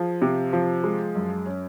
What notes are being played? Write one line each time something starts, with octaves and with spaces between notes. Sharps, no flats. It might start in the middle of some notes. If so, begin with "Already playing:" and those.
Already playing: F3 G#4
C3
F3
G#3
F#2
C#4